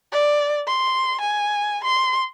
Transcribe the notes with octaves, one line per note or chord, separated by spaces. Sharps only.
D5
C6
G#5
C6